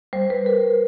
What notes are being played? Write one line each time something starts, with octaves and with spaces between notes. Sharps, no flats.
G3 C5
B4
G3 A#4